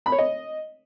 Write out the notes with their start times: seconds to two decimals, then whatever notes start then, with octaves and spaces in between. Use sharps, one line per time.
0.06 B5
0.12 C#5
0.18 D#5